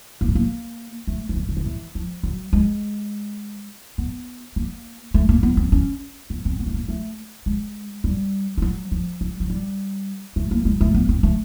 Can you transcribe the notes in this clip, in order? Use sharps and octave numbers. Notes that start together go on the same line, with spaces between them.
A#3
B3
A#3
A3
E3
D#3
D3
D#3
E3
F3
F#3
G#3
B3
A#3
A3
A#3
B3
C4
C#4
B3
C4
B3
A3
A#3
A3
G#3
G3
G3
F#3
F3
F#3
F#3
G3
A3
A#3
G#3
A3
B3
C4
A3